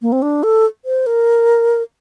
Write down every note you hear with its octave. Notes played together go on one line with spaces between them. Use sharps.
A#3
C4
D4
A4
C5
A#4